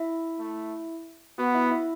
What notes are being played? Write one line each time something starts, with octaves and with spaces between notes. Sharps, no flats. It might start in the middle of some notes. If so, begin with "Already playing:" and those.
Already playing: E4 E5
A3
B3 F#4 F#5
E4 E5
E4 E5